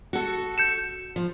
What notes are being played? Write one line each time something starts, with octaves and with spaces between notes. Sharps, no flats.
F#4 A4
G6 C#7 E7
F3